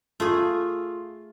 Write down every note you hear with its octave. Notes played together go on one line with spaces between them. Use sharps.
A3 F4 G#4